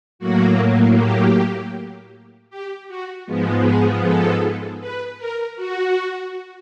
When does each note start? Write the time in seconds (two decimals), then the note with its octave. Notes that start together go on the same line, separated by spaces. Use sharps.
0.19 A2 F#3 A#3 F#4
0.96 G4
2.50 G4
2.88 F#4
3.26 G#2 F3 G#3 B3
3.64 G#4
4.03 A4
4.81 B4
5.18 A#4
5.56 F#4